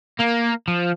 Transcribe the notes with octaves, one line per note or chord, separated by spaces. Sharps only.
A#3
F3